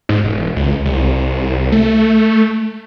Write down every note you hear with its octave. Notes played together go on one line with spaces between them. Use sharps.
G#2
E1
C#2
C2
A3